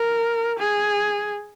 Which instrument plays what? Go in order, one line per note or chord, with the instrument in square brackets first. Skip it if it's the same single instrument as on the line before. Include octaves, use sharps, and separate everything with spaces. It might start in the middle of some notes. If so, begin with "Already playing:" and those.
Already playing: [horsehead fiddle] A#4
G#4